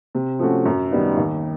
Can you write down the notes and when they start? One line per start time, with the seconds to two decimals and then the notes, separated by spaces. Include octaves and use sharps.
0.15 C3
0.39 F3 A3 C#4 F#4
0.65 F#2
0.91 D#3 G3 B3 D#4
1.17 D#2